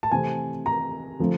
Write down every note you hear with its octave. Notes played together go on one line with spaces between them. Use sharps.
A5
C3 E3 A3 C4 G#5
A#5
D3 F3 A3 C4